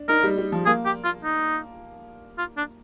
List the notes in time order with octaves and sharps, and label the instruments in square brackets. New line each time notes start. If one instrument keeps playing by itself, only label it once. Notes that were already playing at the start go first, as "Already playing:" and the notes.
Already playing: [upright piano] D4
[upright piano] D#4 [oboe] A#4
[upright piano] G3
G3
F3
[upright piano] A#3 [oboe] G#4
[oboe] G4
F4
D#4
F4
D4